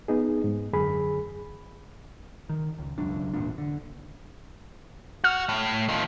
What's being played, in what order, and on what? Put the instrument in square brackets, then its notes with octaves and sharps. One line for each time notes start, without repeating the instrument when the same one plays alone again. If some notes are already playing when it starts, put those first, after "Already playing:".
[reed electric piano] B3 D#4 G#4
G#2
F#2 D3 G#4 B5
[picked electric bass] D#3
C#2
E1 C#2 F#2 D4
G#1 E2 A#2 D4
D3
[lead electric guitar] F#4 [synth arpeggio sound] F6
[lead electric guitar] A2
D#3 F3